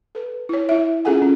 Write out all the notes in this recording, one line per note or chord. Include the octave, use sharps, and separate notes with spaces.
A4 B4
E4 C#5
E4 E5
C#4 F4 G#4 A4 F#5 G#5
C#4